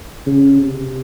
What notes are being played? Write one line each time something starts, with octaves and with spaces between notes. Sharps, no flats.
C#3
C3